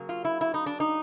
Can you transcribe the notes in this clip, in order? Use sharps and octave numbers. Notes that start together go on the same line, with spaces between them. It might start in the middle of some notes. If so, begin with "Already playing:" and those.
Already playing: C#3 F#3 A#3
F4
E4
E4
D#4
D4
D#4